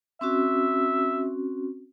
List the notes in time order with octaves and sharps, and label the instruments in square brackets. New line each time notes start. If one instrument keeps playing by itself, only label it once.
[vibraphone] C4 C#4 F#4 [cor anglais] E5